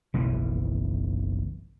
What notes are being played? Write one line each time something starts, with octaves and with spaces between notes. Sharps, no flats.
F#1 B1 E3